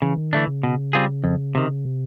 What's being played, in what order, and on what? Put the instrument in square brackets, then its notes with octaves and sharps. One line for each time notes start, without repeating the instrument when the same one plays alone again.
[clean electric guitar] C#3 [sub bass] E3
[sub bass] D#3
[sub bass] D3 [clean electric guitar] E3 A3 D4
[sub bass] C#3
[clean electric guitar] B2
G3 C4 F4 G#4
F2
C3 D#3
[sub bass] C3